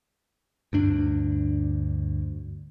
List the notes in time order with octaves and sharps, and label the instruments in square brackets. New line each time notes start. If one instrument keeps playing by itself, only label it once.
[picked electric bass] D2 G2 D4